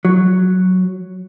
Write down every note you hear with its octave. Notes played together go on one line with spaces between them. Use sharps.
F#3